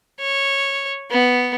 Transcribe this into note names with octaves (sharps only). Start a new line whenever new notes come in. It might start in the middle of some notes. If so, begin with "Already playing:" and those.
C#5
B3